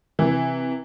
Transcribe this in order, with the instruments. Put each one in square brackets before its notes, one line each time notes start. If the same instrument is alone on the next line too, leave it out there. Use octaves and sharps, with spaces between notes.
[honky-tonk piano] C3 E3